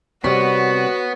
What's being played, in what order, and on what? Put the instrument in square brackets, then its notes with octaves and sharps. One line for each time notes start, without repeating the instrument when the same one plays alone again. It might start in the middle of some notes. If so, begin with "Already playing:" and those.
[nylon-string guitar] C3 G3 [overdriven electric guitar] B3 [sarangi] F#4 [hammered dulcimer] C#5